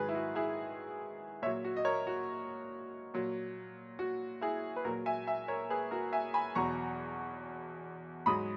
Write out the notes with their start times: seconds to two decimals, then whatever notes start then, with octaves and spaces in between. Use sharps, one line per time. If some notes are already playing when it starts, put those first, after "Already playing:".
Already playing: G#2 D#3 F#3 G#4 B4
0.09 E4
0.15 F#4
0.35 E4 G#4
1.42 A#2 C#5 E5
1.46 F#3
1.64 F#4
1.77 D#5
1.85 A#4 C#5
2.07 F#4
3.14 A#2 F#3
3.99 F#4
4.41 E4 G#4
4.76 B4
4.85 A#2 F#4 A#4
4.88 F#3
5.06 E5 G#5
5.27 E5 G#5
5.48 A#4 C#5
5.70 G#4 B4
5.91 F#4 A#4
6.12 E5 G#5
6.34 G#5 B5
6.55 E2 B2 F#3 A#5 C#6
8.26 G#2 F#3 B5 D#6